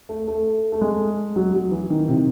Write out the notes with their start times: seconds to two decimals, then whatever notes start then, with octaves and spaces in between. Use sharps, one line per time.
0.09 A3
0.27 A3
0.72 A3
0.81 G#3
1.36 F#3
1.54 F#3
1.71 E3
1.90 D#3
2.08 C3